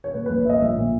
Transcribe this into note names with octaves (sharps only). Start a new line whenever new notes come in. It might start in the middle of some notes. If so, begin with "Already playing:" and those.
C#5
A#2 B4
A#1 B4
C#5
A#3 D#5 E5
A#1 E5
A#2